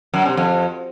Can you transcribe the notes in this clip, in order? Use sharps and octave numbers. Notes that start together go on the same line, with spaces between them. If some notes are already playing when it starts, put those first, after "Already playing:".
F#2
C3
F2